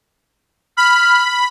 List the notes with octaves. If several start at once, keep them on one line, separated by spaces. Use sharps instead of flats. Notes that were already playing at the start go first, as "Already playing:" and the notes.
B5 F6